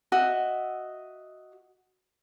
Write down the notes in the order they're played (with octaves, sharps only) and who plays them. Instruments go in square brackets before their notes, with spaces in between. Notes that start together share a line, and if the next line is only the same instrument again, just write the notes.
[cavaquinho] F#4 D#5 E5